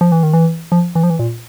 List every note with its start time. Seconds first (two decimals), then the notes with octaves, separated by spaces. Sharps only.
0.01 F3
0.12 E3
0.23 D#3
0.33 E3
0.72 F3
0.95 E3
1.03 F3
1.10 E3
1.19 A#2